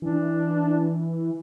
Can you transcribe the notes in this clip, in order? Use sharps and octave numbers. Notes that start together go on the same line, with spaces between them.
E3 D4